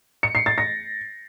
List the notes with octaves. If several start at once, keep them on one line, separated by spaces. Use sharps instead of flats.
C#7
C7
A6
A#6